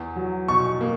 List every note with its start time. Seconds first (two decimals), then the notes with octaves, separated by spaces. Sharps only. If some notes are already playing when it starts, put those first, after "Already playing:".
Already playing: E2
0.16 F#3
0.48 B2 C#6
0.81 A#3